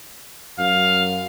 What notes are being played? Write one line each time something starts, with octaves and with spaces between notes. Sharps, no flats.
F#2 F5